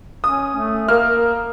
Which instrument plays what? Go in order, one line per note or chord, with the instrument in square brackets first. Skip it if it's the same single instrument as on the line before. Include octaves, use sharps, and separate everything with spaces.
[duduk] C#4 [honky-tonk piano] D#6
[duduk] A3
[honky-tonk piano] A#3 F6 [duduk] A#4